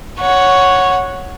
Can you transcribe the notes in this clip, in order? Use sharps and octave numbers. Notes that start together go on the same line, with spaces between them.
C#5 F#5